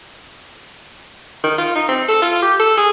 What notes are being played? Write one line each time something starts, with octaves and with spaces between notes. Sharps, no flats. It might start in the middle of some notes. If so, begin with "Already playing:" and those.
D#3
F4
D#4
C4
A4
F4
G4
A4
G#4